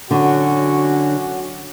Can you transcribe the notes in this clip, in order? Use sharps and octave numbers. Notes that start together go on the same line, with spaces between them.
D3 F#3 C#4 F#4